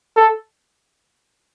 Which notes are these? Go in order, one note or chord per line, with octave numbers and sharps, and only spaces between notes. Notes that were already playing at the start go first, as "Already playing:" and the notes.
A4